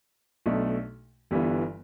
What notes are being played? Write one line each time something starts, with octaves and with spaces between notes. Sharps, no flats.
B1 B2 A3 D4
G1 G2 E3 G3 B3